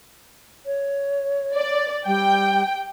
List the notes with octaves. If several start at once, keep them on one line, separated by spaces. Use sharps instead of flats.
C#5
D5
G3 G5